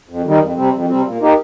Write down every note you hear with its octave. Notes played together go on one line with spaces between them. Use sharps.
F2
D#3 G3 D#4
F2
C3 G3 C4
F2
C3 G3 C4
A#2
A#3 D#4 G4